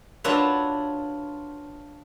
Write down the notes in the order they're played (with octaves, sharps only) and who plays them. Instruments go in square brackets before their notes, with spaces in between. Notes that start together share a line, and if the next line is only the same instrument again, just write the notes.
[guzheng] D4 F4 F#4 B4 C#5 E5